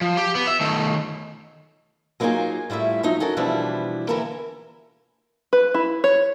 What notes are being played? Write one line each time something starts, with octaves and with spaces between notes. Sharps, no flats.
F3
G4
B3
E5
D#3 A3
F#3 A#3 B3 D#4 F4 G#4
A2 G3 E4 F4 E5
F3 F#3 D#4
C#4 F#4 A4 A#4
B2 E3 F3 G3 D4 E4
D3 E3 A#3 E4 A4 A#4
B4
E4
C#5